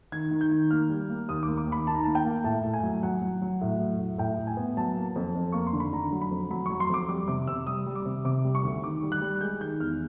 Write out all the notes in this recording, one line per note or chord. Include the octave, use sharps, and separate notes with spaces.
D#3 G#6
D#3
G6
D#3
A#3 F6
G3
A#3
D#2 D#6
D6
A#3
D6
D#2
B5
D#3 A5
A#5
A#3 A5
G5
A#3
A2 A5
A2
G#5
F#3
F#3 F#5
F#3
F#3
A2
F#3
A2
A2 G5
A2
G#5
B3
F#3 A5
A#3
F2
F2
A#3 C#6
C6
D3
B5
D3 A#5
F#3
B5
F2
F#3 B5
F#3 C#6
C6
F2 D6
G3 D6
C3 D6
C3 E6
G3 D#6
G3
D6
C3
C3 D6
G3
C#6
D2
D#3 D6
G3
F#6
G3
G#3 G6
D#3 G6
E2 F6